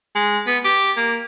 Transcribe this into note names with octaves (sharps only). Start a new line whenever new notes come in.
G#3
B3
G4
A#3